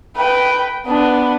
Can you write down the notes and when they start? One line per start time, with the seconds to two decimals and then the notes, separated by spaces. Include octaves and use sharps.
0.16 B4 G5
0.86 B3 D4